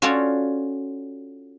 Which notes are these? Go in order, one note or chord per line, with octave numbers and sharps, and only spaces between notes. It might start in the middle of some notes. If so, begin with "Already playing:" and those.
C#4 F4 F#4 A4 C#5 D5